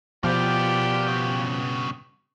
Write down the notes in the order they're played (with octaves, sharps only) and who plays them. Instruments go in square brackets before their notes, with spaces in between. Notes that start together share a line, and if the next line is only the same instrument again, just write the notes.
[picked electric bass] B2 [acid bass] F3 [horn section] B3 F4 G4 [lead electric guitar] A#4 D5
[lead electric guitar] G2 C#3